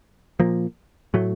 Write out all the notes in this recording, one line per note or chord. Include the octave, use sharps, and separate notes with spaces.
A#2 F3 A#3
A2 F#3 A3